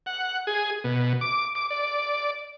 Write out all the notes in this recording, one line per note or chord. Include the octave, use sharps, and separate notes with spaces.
F#5
G#4
B2
D6
D6
D5